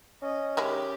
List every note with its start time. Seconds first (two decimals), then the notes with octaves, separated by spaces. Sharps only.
0.22 C#4 D#5
0.57 D#3 G#3 E4 G4